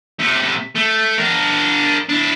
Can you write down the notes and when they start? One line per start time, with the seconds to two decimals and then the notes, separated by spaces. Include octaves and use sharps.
0.19 C3 A3
0.75 A3
1.18 D4 A#4
2.09 D4 E4